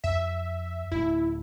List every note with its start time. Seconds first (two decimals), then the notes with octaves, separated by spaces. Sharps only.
0.04 F2 E5
0.92 D1 A3 E4